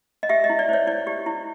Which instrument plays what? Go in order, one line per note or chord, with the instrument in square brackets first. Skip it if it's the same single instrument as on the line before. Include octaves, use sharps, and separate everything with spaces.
[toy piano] D#5
G4 E5
D#5
E4
D5
C5 C#5
E4 D5
G4
E4